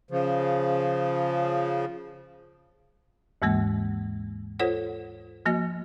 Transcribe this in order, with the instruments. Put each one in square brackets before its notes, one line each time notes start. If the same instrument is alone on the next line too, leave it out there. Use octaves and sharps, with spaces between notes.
[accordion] C#3 F3
[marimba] D#2 G#2 E3 G#3 A#3
F4 A4 C5 C#5 F#5
F3 A#3 F#4 D#5